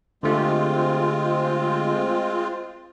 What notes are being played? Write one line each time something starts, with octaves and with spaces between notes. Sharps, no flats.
D3 G#3 A3 C4 F4 G4